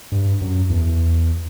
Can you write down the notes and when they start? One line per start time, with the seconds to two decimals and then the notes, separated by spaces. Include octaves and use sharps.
0.12 G2
0.42 F#2
0.70 E2